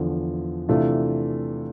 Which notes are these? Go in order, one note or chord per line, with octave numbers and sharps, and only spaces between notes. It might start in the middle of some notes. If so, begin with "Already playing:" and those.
Already playing: E2 D3 F3
C3 E3 A3 D4 F4